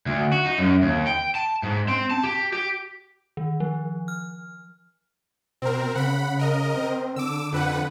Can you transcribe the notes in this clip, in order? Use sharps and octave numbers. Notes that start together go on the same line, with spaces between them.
D2
F#4
D#4
F#2
D#2
G5
A5
G#2
C4
A5
G4
G4
D#3
F3
F6
B2 C4 A#4
C#3 F#5 B5
A#4 D#5
C4
D3 D6 E6
F2 B4 F#5